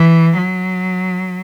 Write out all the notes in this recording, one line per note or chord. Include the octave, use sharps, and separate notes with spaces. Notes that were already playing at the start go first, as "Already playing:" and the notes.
Already playing: E3
F#3